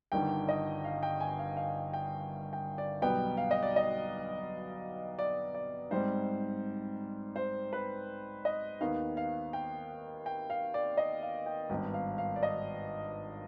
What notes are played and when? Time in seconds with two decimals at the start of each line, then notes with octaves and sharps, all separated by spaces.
0.12 G1 G2 D#3 G3 G5
0.49 D#5
0.84 F5
1.03 G5
1.20 G#5
1.39 F5
1.56 F5
1.94 G5
2.53 G5
2.78 D5
3.02 B1 B2 G3 B3 G5
3.37 F5
3.51 D#5
3.63 D5
3.76 D#5
5.19 D5
5.55 D5
5.91 G#2 G3 C4 C5
7.36 C5
7.73 B4
8.45 D#5
8.81 D#2 D#3 B3 D#4 F5
9.17 F5
9.53 G5
10.26 G5
10.50 F5
10.74 D5
10.97 D#5
11.22 F5
11.46 G5
11.70 G#1 G2 D#3 B3 D#4 G5
11.94 F5
12.18 F5
12.36 D5
12.43 D#5